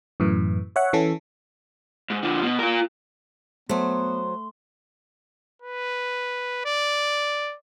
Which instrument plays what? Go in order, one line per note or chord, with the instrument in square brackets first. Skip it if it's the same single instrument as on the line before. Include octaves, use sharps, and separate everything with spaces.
[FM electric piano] F#2 A2 E3
C#5 E5 F#5
E3 C#4 A4
[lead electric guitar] G#2
D3 F3
B2
F4 A#4
[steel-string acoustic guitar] F#3 C5 [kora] A3 [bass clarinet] B3 [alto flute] C6
[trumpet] B4
D5